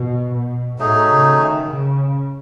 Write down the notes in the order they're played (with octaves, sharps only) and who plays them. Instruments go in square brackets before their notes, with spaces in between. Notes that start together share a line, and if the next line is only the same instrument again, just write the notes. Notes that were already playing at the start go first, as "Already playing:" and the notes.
Already playing: [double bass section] B2
B2
[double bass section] A2 [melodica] F#3 A3 D#4 G#4
[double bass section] C#3
D#3
C#3